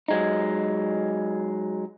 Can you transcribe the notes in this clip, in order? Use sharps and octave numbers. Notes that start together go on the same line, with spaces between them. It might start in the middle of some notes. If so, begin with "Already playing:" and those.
F#3 G#3 D#4